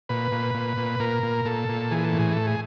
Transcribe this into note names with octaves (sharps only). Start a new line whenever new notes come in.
A#2 B4
A#2
A#2
A#2
A#2 A#4
A#2
A#2 A4
A#2
E3 G#4
A4
A2
G#4
A2 A4
G#4